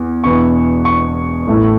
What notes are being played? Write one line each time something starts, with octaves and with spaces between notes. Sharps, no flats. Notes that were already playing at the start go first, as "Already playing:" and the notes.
Already playing: E2
E1 E2 E3 B3 C#6
C#6
A1 A2 A3